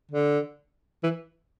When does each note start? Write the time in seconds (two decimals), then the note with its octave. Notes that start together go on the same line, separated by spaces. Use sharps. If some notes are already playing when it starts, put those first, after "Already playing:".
0.11 D3
1.03 E3